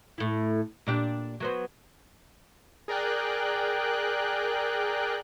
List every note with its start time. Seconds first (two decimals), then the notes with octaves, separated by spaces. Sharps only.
0.18 A2 E4
0.87 A#2 D4 G4
1.40 F#3 B3 C5
2.88 G#4 A#4 D5 G5 F#6